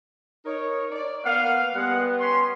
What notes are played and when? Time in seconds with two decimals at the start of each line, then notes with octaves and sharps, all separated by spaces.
0.45 D#4 A#4 C#5
0.91 D5
1.25 A#3 B3 F5 F#5
1.75 G3 G#3 B3 F#5
2.20 C#4 C6